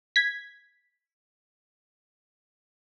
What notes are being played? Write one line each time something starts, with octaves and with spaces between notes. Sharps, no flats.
G#6 B6